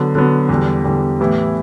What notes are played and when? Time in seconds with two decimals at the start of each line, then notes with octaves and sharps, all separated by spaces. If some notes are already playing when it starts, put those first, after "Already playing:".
Already playing: D3 F#3 B3
0.15 D3 F#3 B3
0.49 E2 D3 G3
0.84 E2 D3 G3
1.19 A2 E3 B3 E4 G4